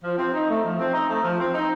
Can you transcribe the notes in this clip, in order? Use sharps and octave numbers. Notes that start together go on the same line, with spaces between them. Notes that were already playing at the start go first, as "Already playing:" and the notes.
F3
C4
D#4
A3
F3
C4
D#4
A3
F3
C4
D#4